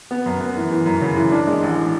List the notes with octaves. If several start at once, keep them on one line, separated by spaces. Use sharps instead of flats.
B3
F#2
B3
E3
E3
F#2
C#3
E3
D4
G#3
A1